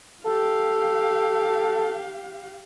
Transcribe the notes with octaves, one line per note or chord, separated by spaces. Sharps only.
G4 A4 F5